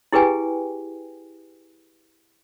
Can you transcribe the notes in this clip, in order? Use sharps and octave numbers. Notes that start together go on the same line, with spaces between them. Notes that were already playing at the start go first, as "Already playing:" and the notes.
E4 G4 G#4 B4 G5 G#5